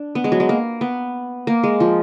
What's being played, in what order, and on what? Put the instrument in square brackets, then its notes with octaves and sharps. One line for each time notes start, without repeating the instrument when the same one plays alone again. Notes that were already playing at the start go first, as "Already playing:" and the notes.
Already playing: [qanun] D4
B3
G#3
F#3
G#3
A#3
B3
A#3
G#3
F3